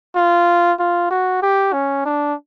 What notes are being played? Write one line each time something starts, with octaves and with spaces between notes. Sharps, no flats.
F4
F4
F#4
G4
C#4
D4